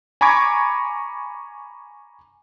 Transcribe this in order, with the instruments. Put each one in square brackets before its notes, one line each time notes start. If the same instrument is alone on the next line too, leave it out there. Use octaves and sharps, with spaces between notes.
[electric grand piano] G#5 A#5 B5 C#6 D6 G#6